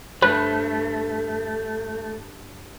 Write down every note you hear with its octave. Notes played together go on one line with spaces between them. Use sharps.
G2 A3 B4 C5